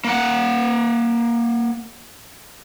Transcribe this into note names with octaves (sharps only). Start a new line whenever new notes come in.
A#3 F#5